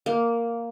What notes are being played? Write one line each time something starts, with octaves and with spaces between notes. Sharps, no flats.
A#3